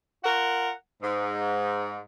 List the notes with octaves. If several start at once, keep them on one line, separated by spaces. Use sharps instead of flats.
F4 A#4 F#5
G#2